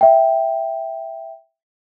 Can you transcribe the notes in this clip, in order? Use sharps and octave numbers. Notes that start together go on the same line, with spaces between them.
E5 G5